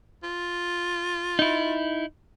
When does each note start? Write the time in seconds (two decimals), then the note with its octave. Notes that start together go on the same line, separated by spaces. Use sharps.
0.23 F4
1.39 D#4 E4